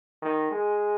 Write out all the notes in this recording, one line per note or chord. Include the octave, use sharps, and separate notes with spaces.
D#3
G#3